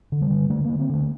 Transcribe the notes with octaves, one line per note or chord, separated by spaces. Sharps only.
D3
G3
D3
D3 A3
D3 A#3
C4
D3 A3